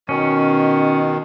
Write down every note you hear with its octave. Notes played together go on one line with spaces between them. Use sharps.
B2 D#3 C#4